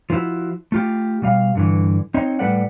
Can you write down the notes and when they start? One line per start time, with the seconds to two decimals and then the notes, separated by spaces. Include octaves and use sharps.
0.10 F3 A#3 C4 E4 F#4
0.72 A3 F4 G4
1.22 B2 G3 F5
1.55 G2 D3 E3
2.14 C4 D#4 C#5 D#5
2.39 A2 G3 A4 B4 D5 F#5